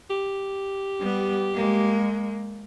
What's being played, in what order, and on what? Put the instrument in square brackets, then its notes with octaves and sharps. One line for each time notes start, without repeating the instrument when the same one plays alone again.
[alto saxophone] G4
[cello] G3 B3
G#3 A#3